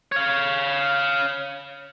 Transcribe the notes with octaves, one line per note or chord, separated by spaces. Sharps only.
C#5 F5